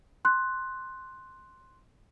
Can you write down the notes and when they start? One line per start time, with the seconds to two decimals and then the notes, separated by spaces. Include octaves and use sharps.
0.25 C6 F#6